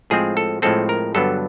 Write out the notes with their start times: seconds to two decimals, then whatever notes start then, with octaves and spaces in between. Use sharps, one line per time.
0.10 A2 F3 G#3 C4 G#4
0.37 A4
0.62 A2 F3 G#3 C4 A4
0.89 A#4
1.15 G2 D3 F#3 B3 D4 A4